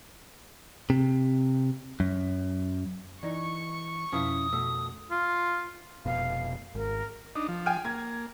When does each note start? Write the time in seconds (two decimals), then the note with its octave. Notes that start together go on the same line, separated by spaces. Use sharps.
0.90 C3
2.00 F#2
3.23 E3 D#4 D5 C#6
4.13 F2 B2 F3 C#4 E4 F5 D#6
4.53 B2 A3 E6
5.11 F4
6.05 F1 B2 F5
6.75 G#1 A#4
7.35 D4 D#4
7.48 F3
7.66 G5 G#5 F6
7.85 A#3 G#6